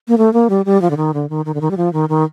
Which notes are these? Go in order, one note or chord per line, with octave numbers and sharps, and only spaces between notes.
A#3
A3
A#3
G3
G3
F3
D3
D#3
D3
D#3
D#3
D3
D#3
G3
F3
D#3
D#3